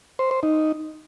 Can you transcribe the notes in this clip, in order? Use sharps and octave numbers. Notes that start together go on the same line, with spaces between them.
C5
C5
D#4